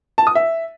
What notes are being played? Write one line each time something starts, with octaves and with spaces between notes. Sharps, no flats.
A5
D#6
E5